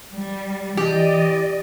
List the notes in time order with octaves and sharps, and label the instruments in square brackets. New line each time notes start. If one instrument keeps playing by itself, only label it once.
[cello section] G3
[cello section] E3 D5 D#5 [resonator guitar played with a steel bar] G4